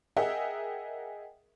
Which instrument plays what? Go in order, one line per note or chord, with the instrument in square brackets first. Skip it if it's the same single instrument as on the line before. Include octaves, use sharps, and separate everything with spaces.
[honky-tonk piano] G#4 A#4 D#5 E5 F#5 G5